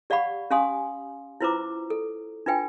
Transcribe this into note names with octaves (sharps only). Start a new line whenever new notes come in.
G4 D5 F5 F#5 B5 C#6
C#4 G4 F5 G#5 C6 D#6
E4 F4 B4 C5 A#5 D6
A4
D4 F4 B4 G5 G#5